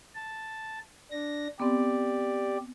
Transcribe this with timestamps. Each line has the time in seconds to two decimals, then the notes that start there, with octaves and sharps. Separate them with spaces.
0.15 A5
1.12 D4 A#6
1.60 B3 C4 G4 D5